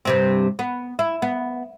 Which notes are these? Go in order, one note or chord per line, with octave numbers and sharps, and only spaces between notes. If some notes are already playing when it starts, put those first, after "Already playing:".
G2 C3 C4
B3
E4
B3